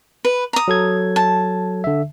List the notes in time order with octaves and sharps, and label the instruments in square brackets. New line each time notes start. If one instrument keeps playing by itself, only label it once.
[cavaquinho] B4
A#5 D#6
[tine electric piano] F#3 A4 G#6
[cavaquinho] A5
[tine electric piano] D3 E5